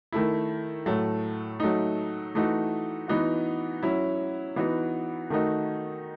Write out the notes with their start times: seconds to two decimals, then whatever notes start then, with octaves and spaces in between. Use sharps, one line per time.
0.12 D#3 A3 E4
0.86 A2 F#3 A3
1.60 F#3 A3 D#4
2.35 E3 A3 D#4 F#4
3.08 E3 B3 D#4 F#4
3.83 F#3 C#4 E4
4.56 E3 B3 D#4 F#4
5.30 D#3 A3 D#4 F#4